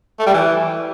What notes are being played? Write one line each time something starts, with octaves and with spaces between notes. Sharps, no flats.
A3
G3
E3